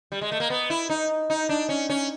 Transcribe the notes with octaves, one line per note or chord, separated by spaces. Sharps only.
G3
G#3
A3
A#3
B3
E4
D#4
D#4
D4
C#4
C#4